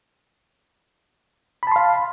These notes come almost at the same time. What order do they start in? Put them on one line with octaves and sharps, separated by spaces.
B5 A5 C6 F5